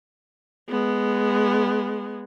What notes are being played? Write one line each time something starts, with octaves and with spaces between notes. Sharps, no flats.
G#3 B3